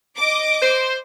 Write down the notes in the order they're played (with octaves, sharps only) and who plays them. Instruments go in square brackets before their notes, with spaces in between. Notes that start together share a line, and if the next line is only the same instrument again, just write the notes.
[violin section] D#5 D6
[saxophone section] C5